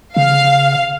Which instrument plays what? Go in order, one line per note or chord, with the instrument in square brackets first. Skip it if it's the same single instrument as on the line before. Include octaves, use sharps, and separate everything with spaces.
[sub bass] C#3 [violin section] F5